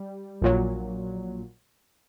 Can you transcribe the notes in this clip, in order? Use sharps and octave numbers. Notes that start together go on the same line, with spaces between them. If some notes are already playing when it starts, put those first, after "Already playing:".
Already playing: G3
A#1 A#2 F#3